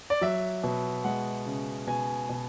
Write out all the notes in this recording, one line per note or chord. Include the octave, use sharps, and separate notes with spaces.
D5
F#3 E5
B2
G#3 F#5
C#3
B2 G#5
B2